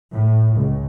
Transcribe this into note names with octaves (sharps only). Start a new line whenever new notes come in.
A2
C#2